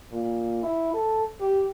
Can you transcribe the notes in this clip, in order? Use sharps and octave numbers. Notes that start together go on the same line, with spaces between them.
A#2
E4
A4
G4